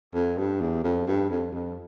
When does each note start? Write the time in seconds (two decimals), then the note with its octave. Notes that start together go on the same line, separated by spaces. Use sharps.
0.14 F2
0.38 G2
0.61 E2
0.84 F2
1.07 G2
1.30 F2
1.52 F2